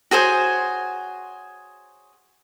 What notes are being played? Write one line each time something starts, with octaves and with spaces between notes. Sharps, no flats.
F#4 G#4 C5 C#5